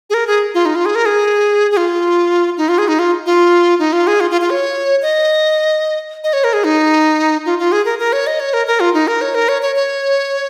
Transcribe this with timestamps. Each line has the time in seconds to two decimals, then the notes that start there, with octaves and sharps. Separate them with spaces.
0.10 G#4
0.14 A#4
0.27 G#4
0.54 F4
0.65 D#4
0.75 F4
0.85 G#4
0.95 A#4
1.06 G#4
1.71 G#4
1.77 F4
2.57 D#4
2.69 F4
2.78 G#4
2.88 D#4
2.99 F4
3.26 F4
3.79 D#4
3.93 F4
4.07 G#4
4.20 F4
4.31 F4
4.41 F4
4.50 C#5
5.02 D#5
6.24 D#5
6.33 C#5
6.44 A#4
6.53 G#4
6.64 D#4
7.46 F4
7.59 F4
7.72 G#4
7.85 A#4
7.99 A#4
8.13 C#5
8.27 D#5
8.40 C#5
8.54 A#4
8.67 A#4
8.80 F4
8.94 D#4
9.08 A#4
9.21 C#5
9.35 A#4
9.49 C#5
9.62 C#5
9.76 C#5